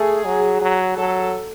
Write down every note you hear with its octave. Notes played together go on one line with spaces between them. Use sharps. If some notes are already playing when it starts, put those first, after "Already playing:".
Already playing: A3 G#4
F#3
F#3
F#3 A4